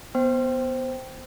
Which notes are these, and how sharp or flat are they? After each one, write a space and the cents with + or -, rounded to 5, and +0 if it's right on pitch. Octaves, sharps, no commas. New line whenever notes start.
B3 +0 C5 +0 G5 -5